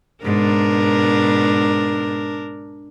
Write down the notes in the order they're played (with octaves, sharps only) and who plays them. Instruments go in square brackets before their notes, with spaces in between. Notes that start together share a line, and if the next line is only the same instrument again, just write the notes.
[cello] G#2 B2 [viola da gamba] D4 A#4